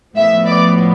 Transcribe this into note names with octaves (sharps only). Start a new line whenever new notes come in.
A2 F3 B3 E5
D5